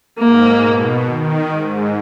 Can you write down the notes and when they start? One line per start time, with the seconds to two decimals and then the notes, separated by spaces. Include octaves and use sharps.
0.18 G#2 A#3
0.61 B2
1.05 D#3
1.49 G#2